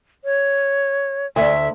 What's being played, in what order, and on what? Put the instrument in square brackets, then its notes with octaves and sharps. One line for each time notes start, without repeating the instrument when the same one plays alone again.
[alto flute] C#5
[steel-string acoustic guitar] D2 [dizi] E5